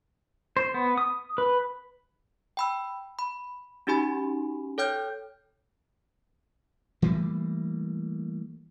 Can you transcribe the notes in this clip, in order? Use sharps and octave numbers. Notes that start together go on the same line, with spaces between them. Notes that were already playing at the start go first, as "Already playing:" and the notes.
C5
B3
D#6
B4
G5 B5 E6
B5
C#4 D#4 F#4 G4 G#5 B5
A4 C#5 G5 F6 G6
E3 G3 A3 A#3